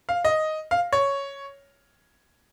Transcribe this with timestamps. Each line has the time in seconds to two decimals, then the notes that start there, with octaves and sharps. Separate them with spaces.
0.09 F5
0.25 D#5
0.71 F5
0.93 C#5